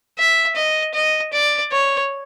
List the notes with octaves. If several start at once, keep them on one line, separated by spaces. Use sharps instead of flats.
E5
D#5
D#5
D5
C#5